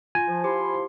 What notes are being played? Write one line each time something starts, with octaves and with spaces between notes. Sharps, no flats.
F4 G#5
F3
F3 E4 G4 C6